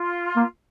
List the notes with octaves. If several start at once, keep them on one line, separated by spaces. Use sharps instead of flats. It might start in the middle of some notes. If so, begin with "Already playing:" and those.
Already playing: F4
A#3